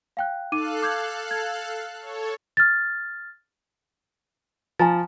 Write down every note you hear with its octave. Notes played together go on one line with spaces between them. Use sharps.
F5 G5 F#6
D#4 A4 F5 D6 F#6 D#7
D6 G6 G#6
G#6
A4 C#5
F6 A6
F3 G#5 A#5 A6